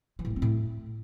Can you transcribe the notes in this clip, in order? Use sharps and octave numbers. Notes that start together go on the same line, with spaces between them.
E3
A2
A3
C4
A2